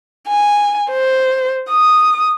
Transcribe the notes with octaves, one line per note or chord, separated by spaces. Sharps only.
G#5
C5
D#6